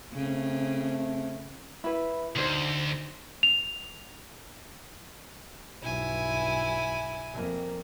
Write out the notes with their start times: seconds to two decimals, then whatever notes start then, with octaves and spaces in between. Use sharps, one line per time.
0.14 C#3 A3 C4
1.84 E4 B4
2.36 D2 D#4 C5
3.43 F7
5.82 B1 G2 E4 G#5
7.33 F2 A#3